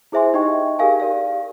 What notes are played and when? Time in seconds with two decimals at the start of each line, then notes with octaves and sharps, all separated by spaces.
0.12 E4 G#4 C5 E5 G#5 C6
0.34 D#4 G4 D#5 G5 C#6
0.79 G4 G#4 A#4 F5 G#5
1.00 G4 A#4 D5 F5